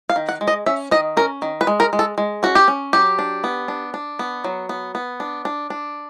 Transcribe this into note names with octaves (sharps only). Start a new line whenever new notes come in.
F5
D#3
F#5
G#3
D#5
C#4 E5
D#3 D#5
C#4 A#4
D#3
B4
G#3
A#4
G#3
A4
G#3
C#4 F#4
G4
C#4
F#3 G4
D4
B3
D4
D4
B3
F#3
B3
B3
D4
D4
D4